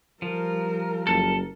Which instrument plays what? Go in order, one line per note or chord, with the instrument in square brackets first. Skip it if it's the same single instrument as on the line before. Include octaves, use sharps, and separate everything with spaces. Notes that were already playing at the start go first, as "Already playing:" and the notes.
[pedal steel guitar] F3 [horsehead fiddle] G3 A#4
[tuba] F#1 [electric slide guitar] A4